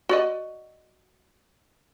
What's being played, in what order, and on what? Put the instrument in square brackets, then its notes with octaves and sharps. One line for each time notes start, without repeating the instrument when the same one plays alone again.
[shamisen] F#4 D5 D#5